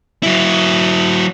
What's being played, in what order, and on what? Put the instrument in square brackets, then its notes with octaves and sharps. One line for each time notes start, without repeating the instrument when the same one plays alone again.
[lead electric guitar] F#3 E4